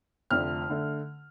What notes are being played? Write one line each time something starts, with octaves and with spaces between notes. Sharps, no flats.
F1 F2 D3 A3 D4 F6
D3 A3